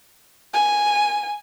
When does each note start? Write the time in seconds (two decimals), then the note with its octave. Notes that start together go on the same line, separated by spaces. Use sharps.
0.54 G#5